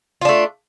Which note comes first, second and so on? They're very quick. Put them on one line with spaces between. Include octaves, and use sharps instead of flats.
F4 D4 A3